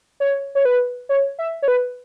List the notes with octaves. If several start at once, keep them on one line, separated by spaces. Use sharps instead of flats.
C#5
C#5
B4
C#5
E5
C#5
B4